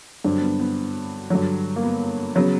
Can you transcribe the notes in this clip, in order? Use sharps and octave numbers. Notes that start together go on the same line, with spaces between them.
G2 D3 F#3 C4 D4
B3
B3
G2 D3 F#3
A#3
B3
C#3 F#3 B3